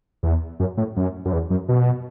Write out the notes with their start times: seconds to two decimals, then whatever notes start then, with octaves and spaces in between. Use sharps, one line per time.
0.23 E2
0.60 F#2
0.77 A2
0.97 F#2
1.25 F#2
1.33 E2
1.50 F#2
1.69 B2